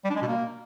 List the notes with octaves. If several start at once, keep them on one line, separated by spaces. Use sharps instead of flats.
G3
D4
G#3
B2
A#3